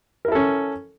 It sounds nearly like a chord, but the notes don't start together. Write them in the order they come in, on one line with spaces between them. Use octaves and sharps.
A#4 E4 A4 C#4